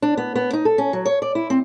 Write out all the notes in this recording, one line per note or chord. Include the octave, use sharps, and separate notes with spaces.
D4
B3
B3
D#4
A4
C#4
F#3
C#5
D5
E4
C4